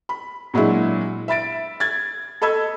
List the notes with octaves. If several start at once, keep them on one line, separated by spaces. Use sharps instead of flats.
B5
A#2 F#3 G#3 D4 E4
E5 B5 A6 D7
G#6 A6
A4 D#5 B5 E6 G#6